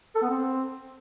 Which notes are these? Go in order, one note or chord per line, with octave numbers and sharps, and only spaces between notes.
A4
B3
C4